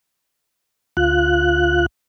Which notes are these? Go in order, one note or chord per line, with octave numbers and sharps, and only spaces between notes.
D2 F4 F#6